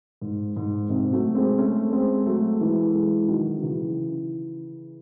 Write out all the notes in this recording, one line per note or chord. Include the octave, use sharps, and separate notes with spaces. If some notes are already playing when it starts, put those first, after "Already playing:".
G#2
G#2
G#2 C3
F#3 A3
G#3 C4
A3 C#4
G#3 C4
F#3 A3
E3 G#3
E3 G#3
D#3 F#3
F#3
C#3 E3